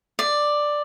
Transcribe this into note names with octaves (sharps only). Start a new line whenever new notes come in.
D5